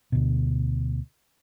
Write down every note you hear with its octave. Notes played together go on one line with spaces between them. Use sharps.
D2 B2